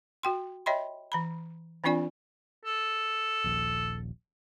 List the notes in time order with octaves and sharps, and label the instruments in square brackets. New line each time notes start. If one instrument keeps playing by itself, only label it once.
[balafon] F#4 G5 C6
C#5 D#5 E5 G5 B5 C6
E3 A#5 B5
E3 C4 D4 F4 D5 G#5
[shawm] A4
[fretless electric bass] D#1 A#1